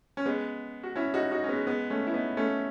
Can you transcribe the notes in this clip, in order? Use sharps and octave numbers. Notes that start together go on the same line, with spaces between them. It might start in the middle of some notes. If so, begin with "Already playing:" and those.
C#4
G#3 B3
F#4
C#4 E4
D#4 F#4
D#4 F#4
C#4
G#3 B3
G#3 B3
A3 C#4
E4
B3 D#4
A3 C#4